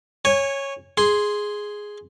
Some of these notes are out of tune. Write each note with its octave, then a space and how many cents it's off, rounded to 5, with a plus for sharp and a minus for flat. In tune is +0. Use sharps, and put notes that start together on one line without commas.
C#5 -5 G#5 -20
G#4 +0 C6 +0